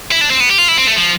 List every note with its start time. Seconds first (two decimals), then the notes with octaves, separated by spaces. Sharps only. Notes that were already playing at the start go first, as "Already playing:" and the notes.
0.12 E4
0.21 D4
0.30 C4
0.40 B3
0.49 G4
0.58 F4
0.68 E4
0.77 C4
0.87 A3
0.96 F3